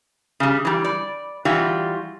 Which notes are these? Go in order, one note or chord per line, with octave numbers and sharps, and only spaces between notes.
C#3 G3
E3 G3
D5
E3 G3 F4 F#4